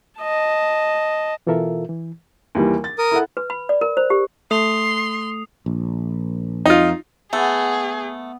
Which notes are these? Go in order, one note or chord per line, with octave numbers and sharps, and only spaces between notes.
D#5 A5
B2 E3 F4 A4 A#4 E5
E3
D#2 E3 G3
A6
A#4 D#6
E4 A4 F#5
B4
B5
D5
A#4
C5
G4
A3 C6 D#6 C7 F7
A#1
F2 D#4 F4
A3 B3 G#4